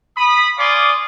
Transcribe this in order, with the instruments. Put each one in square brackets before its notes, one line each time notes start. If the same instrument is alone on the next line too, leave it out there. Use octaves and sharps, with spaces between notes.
[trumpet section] B5 D#6
D5 F5 G#5 C6 D6 D#6